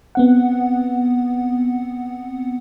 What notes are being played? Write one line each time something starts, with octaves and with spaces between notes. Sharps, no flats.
B3 C4 F#5